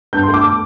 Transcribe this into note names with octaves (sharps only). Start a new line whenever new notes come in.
G2 G6
C6
A3
D6
D6